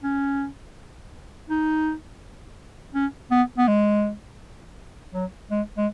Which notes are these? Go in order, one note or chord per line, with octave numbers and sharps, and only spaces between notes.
C#4
D#4
C#4
B3
B3
G#3
F#3
G#3
G#3